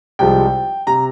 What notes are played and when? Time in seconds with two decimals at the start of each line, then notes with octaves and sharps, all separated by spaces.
0.19 C2 C3 F3 G#3 G5
0.87 C3 A#5